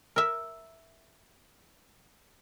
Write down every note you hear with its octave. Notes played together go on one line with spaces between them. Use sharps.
A#4 E5